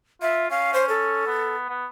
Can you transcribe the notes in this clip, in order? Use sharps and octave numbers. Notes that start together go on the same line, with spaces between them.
F4 E5
C#4 F5
C5
A4
B3
B3